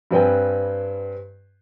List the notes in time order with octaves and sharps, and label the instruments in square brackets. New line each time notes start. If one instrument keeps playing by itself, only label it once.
[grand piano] G2 G3 C4 B4 G5 G#5